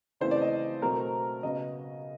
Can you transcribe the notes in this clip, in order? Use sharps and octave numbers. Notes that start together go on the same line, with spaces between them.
C#3 E3 A3 C4 C5
D5
D#5
B2 F#3 A3 C4 A#4
C#3 F#3 B3 D#5